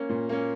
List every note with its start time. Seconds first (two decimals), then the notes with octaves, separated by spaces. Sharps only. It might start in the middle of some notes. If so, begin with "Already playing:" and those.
Already playing: A#3 C#4
0.09 A#2
0.29 A#3 C#4